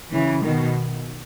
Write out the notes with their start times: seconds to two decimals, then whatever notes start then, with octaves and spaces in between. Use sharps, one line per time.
0.13 C#3 E3
0.44 B2 D#3